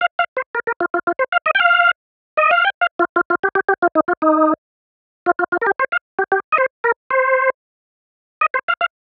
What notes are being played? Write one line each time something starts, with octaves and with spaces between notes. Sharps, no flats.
F5
F5
C5
A#4
A#4
F4
F4
F4
C5
F5
D#5
G5
F5
D#5
F5
G5
F5
F4
F4
F4
G4
G4
G4
F4
D#4
F4
D#4
F4
F4
F4
A#4
G4
C5
F5
G4
G4
D#5
C5
A#4
C5
D#5
C5
F5
F5